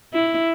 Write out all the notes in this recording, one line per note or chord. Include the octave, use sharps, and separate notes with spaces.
E4